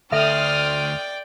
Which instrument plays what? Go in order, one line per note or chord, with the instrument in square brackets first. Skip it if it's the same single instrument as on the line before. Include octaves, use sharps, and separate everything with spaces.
[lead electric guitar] D2 [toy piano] A4 E5 [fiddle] D5 G5 [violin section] C6 D#6 F6